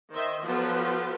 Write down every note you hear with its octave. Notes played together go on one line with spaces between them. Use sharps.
D#3 C5 D#5 E5
F3 F#3 B3 A4 B4